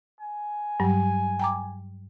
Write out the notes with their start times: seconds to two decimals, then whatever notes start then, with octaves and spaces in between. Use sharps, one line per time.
0.20 G#5
0.80 G2 F#3 G3
1.39 G5 A#5 D6